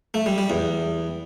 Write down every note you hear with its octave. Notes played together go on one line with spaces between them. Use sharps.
A3
G3
G3
E2